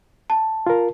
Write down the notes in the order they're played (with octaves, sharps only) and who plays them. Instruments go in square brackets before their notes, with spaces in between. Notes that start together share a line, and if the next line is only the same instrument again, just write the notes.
[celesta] A5
[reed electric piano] F4 A#4